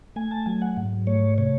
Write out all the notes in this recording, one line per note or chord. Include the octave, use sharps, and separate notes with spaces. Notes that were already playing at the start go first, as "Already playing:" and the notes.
A3 G#5
A5
F#3 G#5
F#5
G#2
A3 C#5
C3 C#5